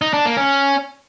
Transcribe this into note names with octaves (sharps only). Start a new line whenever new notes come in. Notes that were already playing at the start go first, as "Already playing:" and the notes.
D#4
D4
A#3
C#4